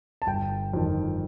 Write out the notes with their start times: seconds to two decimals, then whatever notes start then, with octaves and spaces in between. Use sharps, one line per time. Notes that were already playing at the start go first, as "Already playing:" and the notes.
0.22 A5
0.27 G1 G5
0.73 F2 D#3